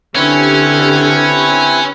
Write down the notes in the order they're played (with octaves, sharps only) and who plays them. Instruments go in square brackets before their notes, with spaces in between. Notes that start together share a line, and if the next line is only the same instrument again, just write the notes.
[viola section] D3 G4 [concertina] C4 E4 B4 [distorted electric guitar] C#4